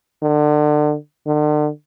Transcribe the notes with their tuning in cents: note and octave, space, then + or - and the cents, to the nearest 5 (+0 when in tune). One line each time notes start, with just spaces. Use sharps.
D3 +30
D3 +40